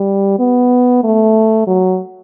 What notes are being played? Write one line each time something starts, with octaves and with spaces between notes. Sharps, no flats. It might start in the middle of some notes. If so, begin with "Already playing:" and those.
Already playing: G3
B3
A3
F#3